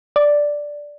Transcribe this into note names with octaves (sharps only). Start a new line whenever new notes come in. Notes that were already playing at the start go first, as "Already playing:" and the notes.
D5